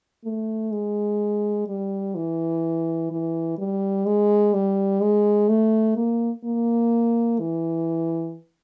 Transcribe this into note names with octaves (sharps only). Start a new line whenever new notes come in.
A3
G#3
G3
E3
E3
G3
G#3
G3
G#3
A3
A#3
A#3
E3